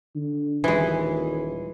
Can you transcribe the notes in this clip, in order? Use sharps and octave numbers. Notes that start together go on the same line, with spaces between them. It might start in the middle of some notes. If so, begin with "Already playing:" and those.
D3
D#1 E3 G#3